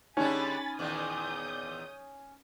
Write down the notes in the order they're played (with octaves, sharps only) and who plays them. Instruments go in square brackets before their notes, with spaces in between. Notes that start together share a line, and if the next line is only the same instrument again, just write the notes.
[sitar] D3 G3 G#3 [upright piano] C#4 [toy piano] D#4 [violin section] G#5 B5 A6
[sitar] E2 A#2 D#3 [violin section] D#6 G6